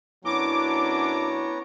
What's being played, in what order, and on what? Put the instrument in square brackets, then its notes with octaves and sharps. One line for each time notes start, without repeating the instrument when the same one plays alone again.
[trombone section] F#2 F#3 D4 [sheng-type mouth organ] B3 C#4 A#5 [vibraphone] E4 [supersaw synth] D6